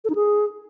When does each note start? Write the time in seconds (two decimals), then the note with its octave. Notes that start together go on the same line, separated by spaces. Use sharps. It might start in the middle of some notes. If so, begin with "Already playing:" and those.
0.04 A4
0.10 D#4
0.15 G#4